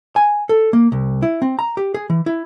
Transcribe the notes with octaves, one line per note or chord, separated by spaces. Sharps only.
G#5
A4
A#3
C2
E4
C4
A#5
G4
G#4
E3
E4